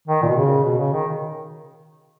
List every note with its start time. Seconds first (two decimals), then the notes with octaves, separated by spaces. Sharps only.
0.08 D#3
0.22 A#2
0.29 B2
0.37 C#3
0.64 B2
0.78 C#3
0.93 D#3